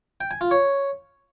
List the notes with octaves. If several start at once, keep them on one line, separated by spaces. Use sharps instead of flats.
G5
G#5
F4
C#5